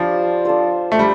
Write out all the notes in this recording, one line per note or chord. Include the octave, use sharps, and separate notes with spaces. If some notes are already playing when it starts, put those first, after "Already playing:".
Already playing: F3 G3 D4 F4 C5
D4 F4 A4 C5
A3
G3 D4